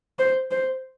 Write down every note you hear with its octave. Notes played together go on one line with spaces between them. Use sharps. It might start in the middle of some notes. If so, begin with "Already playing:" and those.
C5
C5